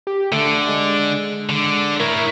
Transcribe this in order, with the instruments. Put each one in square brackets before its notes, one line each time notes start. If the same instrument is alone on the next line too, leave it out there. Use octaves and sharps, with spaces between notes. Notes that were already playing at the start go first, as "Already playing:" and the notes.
[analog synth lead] G4
[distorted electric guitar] D3 [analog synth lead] A3
[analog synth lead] G#3
[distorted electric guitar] D3
[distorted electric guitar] E4 C#5 [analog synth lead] A#4